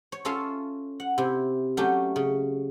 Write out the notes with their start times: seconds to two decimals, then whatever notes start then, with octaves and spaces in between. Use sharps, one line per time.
0.12 C#5
0.25 C#4 F4 A4 C#5 E5 F5
1.00 F#5
1.18 C3 E4
1.77 F#3 A3 C#4 G4
2.16 C#3